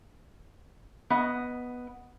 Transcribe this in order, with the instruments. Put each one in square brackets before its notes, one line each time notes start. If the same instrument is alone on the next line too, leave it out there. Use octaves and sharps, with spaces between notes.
[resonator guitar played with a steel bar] B3 D#5